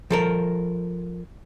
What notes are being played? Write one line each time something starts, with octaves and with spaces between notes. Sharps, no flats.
F3 A4 A#4